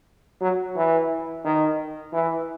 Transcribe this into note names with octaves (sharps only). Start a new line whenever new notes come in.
F#3
E3
D#3
E3